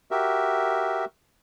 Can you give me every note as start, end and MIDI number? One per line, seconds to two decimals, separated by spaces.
0.11 1.05 66
0.11 1.05 67
0.11 1.05 70
0.11 1.05 76